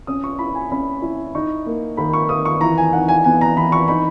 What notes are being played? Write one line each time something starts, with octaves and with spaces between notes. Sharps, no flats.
C#4 D#6
C#6
E4 B5
G#5
C#4 B5
E4
D#4 C#6
A#3
D#3 B5
C#6
D#3 D#6
C#6
E3 A#5
G#5
D#4 F#5
G#5
B3 G#5
A#5
E3 B5
C#6
D#4 B5